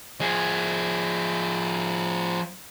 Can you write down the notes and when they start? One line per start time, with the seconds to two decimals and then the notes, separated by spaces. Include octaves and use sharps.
0.20 F3 G#4